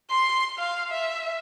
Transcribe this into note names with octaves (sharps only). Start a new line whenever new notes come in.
C6
F5
E5